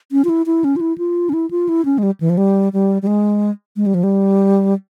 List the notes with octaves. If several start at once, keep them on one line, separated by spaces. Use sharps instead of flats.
C#4
F4
E4
E4
C#4
F4
E4
F4
C#4
E4
F4
E4
C#4
G#3
G3
E3
F3
G3
G3
G3
G#3
G#3
G3
F3
G3